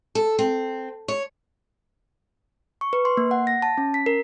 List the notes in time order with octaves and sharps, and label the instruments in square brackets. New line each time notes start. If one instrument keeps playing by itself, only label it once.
[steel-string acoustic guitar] A4
C4
C#5
[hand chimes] C#6
B4
C6
A#3
F#5
A#6
A5
C#4
B6
A#4